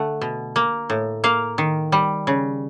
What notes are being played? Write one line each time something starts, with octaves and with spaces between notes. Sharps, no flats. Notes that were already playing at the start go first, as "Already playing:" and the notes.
Already playing: D3 A3 F#5
B2
A#3
A2
A#3 F5
D#3
G3
C#3